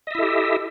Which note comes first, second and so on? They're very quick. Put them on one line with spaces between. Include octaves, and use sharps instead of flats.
D#5 E5 E4 A4 G4